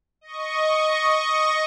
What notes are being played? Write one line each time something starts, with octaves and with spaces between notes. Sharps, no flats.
D#5 C#6